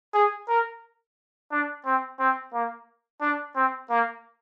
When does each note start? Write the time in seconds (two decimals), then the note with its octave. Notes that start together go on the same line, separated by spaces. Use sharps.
0.14 G#4
0.49 A#4
1.52 D4
1.86 C4
2.19 C4
2.53 A#3
3.21 D4
3.56 C4
3.90 A#3